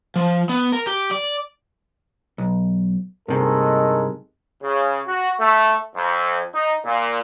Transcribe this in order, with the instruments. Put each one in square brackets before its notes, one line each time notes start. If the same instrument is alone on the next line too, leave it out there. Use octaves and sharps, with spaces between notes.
[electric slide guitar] F3
B3
A#4
G4
D5
[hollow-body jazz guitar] B1
[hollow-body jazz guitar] G2 C3 [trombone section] D#3 G#3 A4
[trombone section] C#3
F#4
A3
F2
D#4
A#2